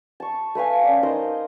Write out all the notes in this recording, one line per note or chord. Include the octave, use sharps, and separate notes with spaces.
A5 C#6
A3 B4 F5 G#5
C#4 D5
D#4 A#4 C5 D#5